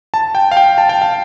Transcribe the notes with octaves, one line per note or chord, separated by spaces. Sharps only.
A5
G5
F5
G5
A5
G5
F5